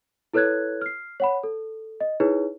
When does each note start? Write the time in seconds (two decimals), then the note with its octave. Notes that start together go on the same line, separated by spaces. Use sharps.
0.33 E4 A4 B4 C#5 F#6 G#6
0.82 F6 C7
1.20 C#5 F#5 B5
1.43 A4
2.00 D#5
2.20 D#4 E4 G#4 B4 C#5